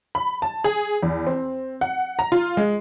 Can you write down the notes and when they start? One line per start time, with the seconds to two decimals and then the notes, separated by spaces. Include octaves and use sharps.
0.15 B5
0.42 A5
0.64 G#4
1.03 E2
1.27 C4
1.81 F#5
2.19 A#5
2.32 F4
2.57 G#3